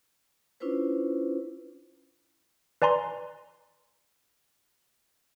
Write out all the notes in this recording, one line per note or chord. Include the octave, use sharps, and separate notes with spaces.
C#4 D4 E4 F4 B4 C5
B4 D5 G#5 A#5 C6